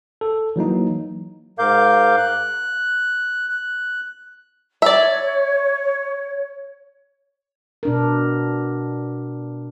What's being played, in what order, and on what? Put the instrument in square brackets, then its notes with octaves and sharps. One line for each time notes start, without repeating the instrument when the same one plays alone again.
[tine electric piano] A4
E3 F#3 A#3 D#4
[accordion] G#2 A#4 F5 D6 G6
F#6
F#6
[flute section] C#5 [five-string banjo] D5 E5
[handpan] B2 D4 A#4